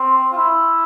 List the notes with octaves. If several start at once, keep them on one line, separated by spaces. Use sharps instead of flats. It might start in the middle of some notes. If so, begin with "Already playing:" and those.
Already playing: C4
F4
E4